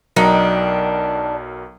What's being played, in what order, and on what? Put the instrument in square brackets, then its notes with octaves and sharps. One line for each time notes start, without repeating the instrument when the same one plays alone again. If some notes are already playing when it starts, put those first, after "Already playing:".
[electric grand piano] B1 F#3 A#4 [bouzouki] D4 D#4 G5